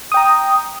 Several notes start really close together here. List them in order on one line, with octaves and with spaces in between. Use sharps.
D#6 G5 A#5